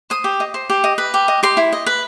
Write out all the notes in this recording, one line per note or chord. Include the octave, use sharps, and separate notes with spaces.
C5 D#6
G4
D#5
C5
G4
D#5
B4
G4
D#5
G4 C6
E4
D#5
B4